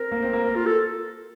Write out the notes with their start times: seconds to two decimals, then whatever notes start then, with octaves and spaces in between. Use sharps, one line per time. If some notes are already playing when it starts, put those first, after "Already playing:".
Already playing: C4 A#4
0.12 A#3
0.23 C4
0.33 A#3
0.44 A#4
0.55 F4
0.66 A4